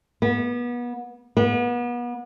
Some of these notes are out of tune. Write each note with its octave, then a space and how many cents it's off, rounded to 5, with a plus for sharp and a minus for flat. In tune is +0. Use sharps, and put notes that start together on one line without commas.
B3 -30
B3 -35